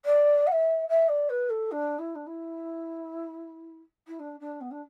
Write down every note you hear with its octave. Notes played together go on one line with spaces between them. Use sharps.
D5
F#5
E5
E5
D5
B4
A4
D4
E4
D4
E4
E4
D4
D4
B3
D4